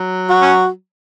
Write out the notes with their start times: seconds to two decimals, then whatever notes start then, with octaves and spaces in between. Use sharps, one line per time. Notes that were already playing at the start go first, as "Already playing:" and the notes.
Already playing: F#3
0.30 F#4
0.42 C#4